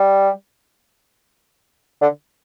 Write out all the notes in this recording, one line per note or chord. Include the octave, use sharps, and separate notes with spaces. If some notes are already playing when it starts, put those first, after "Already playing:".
Already playing: G3
D3